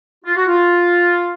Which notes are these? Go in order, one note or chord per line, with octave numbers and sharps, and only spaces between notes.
F4
F#4
F4